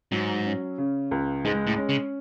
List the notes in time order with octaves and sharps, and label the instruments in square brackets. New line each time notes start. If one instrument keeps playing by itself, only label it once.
[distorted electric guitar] G#2 [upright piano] F#3
[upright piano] C#4
C#3
C#2
[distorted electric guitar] G#2 [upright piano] G#3
[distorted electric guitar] A2
[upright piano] C#4
[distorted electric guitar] C#3